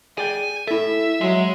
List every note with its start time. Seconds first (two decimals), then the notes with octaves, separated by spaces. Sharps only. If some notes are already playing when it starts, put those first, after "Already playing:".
0.18 G#4 D5 G5 G#5
0.67 E4 A4 E5
1.21 F#3 G#3 E5